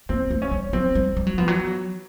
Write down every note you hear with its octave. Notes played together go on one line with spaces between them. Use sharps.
A#3 C4
A3
C#4
G3
F#3 C4
G3
G3
F#3
F3 B3
F#3